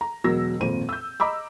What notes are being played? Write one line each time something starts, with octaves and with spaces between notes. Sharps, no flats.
A#5
E1 B2 F#3 A#4 E6 A#6
G#1 F2 A#2 C5 D#7
E6 G6
D#5 A#5 B5 D6 E6